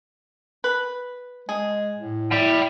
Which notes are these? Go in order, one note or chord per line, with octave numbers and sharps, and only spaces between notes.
B4
G#3 G#4
A2
E4 G5 B5